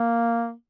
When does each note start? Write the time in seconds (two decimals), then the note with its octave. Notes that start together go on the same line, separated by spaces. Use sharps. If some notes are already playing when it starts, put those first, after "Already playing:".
Already playing: A#3